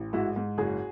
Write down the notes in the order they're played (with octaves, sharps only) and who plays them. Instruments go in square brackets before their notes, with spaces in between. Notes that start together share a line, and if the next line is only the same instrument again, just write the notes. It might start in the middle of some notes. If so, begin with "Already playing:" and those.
Already playing: [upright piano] A1
G#2 E4 F#4
G#2
F#1 F#4 G#4